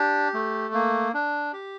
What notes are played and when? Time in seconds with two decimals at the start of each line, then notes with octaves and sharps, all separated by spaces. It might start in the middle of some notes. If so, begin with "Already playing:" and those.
Already playing: D4 G4
0.34 A3
0.74 A#3
1.14 D4
1.53 G4